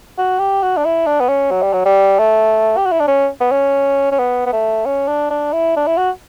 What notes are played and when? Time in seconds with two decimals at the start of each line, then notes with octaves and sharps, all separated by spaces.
0.18 F#4
0.39 G4
0.62 F#4
0.77 D4
0.85 E4
1.07 D4
1.20 B3
1.29 C#4
1.51 F#3
1.62 G3
1.73 F#3
1.85 G3
2.19 A3
2.77 G4
2.85 F#4
2.92 E4
3.00 D4
3.07 C#4
3.41 B3
3.51 C#4
4.12 C#4
4.19 B3
4.46 B3
4.53 A3
4.85 C#4
5.08 D4
5.30 D4
5.53 E4
5.76 D4
5.87 E4
5.98 F#4